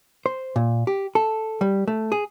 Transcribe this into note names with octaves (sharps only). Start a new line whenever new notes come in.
C5
A#2
G4
A4
G3
A3
G#4